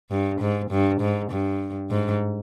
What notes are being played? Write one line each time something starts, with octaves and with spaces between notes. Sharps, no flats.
G2
G#2
G2
G#2
G2
G#2